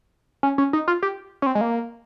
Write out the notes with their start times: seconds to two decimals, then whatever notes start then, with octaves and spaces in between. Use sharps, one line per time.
0.43 C#4
0.58 C#4
0.73 D#4
0.88 F4
1.03 G4
1.42 C#4
1.46 C4
1.55 G#3
1.61 A#3